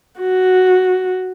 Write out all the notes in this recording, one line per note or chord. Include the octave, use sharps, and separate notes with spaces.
F#4